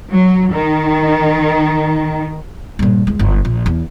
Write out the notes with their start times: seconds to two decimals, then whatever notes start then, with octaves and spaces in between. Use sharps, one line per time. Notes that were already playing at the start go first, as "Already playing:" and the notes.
0.10 F#3
0.52 D#3
2.79 G2 A#2
3.07 E2 G#3
3.19 G1 F#2
3.45 A#1
3.66 E2